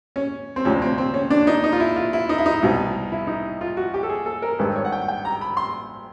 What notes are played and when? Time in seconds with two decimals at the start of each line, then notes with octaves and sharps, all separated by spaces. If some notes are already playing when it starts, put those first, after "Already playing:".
0.16 C#4
0.56 C4
0.65 D2 C3 F3 C#4
0.82 C4
0.98 C4
1.14 C#4
1.30 D4
1.47 D#4
1.64 D#4
1.72 F4
1.80 E4
1.96 F4
2.13 E4
2.29 D#4
2.38 E4
2.46 D#4
2.63 C2 B2
3.12 E4
3.27 D#4
3.61 F4
3.77 F#4
3.94 G4
4.03 A4
4.09 G#4
4.26 A4
4.42 A#4
4.59 G#1 G2 D#3 B4
4.76 C#5
4.85 F#5
4.92 G5
5.08 G5
5.25 A#5
5.41 B5
5.57 C6